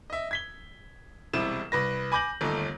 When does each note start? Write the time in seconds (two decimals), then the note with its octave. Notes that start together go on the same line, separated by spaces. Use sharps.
0.10 D#5 E5
0.31 G#6 B6 G7
1.33 E1 C2 C3 E4 E7
1.72 C2 B4 A#6
2.12 G#5 B5 D6 G6 A#6 F#7
2.41 G1 D#2 A3 D#4